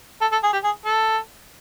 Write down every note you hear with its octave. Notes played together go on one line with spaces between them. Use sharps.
A4
A4
G#4
G4
G#4
A4